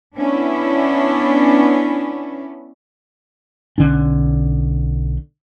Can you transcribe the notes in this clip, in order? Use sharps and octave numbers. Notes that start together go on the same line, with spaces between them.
B3 C#4 D4 E4
B1 D3 C#4 D4